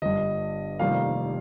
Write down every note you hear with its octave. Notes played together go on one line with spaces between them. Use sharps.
G1 G2 G3 D#5
F1 F2 D#3 G3 A#3 F5